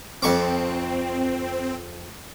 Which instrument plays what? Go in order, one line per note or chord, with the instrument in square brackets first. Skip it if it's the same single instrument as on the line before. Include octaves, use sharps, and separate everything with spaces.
[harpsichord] F2 C#6 D6 [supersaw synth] C4